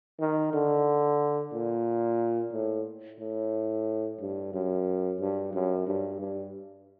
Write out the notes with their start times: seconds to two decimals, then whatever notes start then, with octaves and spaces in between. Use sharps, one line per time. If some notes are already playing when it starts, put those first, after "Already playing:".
0.20 D#3
0.53 D3
1.53 A#2
2.53 A2
3.20 A2
4.20 G2
4.53 F#2
5.20 G2
5.53 F#2
5.87 G2
6.20 G2